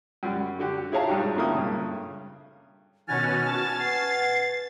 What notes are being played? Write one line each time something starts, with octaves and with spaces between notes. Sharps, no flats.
F#2 G3
D3 F#4 G4
E4 G#4 C#5 F5 A5 A#5
G2 D4 D#4 F#4 G4
A#1 C#3 A3 A#3 E4 D#6
G2 C#3
B2 D#3 C#4 F#4 G#5 F6 A6
A#1 A5 A6
B4 F#5 C7